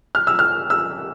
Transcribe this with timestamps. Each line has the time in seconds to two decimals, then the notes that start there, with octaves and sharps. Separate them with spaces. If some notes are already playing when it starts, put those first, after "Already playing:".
0.15 F6
0.27 E6
0.39 F6
0.70 E6